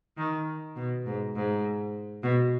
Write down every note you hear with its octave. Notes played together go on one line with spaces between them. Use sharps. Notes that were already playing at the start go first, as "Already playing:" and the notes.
D#3
B2
G#2
G#2
B2